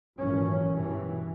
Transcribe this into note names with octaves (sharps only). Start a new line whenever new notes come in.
G#1 F#2 A#2 E3 C#4
G2 B2 E3